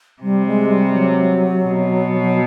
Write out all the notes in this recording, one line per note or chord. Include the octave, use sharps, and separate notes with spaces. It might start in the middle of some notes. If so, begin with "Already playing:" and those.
C3 G3
G#3
G3
F#3
B2
F#3